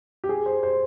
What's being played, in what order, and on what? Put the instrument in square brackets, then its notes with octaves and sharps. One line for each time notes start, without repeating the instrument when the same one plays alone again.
[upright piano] G4
G#4
C5
C5